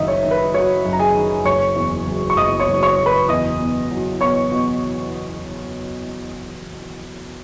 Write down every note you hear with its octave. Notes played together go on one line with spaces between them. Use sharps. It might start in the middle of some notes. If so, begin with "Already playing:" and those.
Already playing: F#1 D#3 D#4 D#5 E5
C#5
D#3
B4
F#3 C#5
F#2
A#5
G#4 G#5
D#3
F#1 C#5 C#6
E2
F#1
C#6
F#1 D#5 D#6
C#5 C#6
F#1
C#5 C#6
F#1
B4 B5
E2 D#5 D#6
B2
F#3
B2 C#5 C#6
B2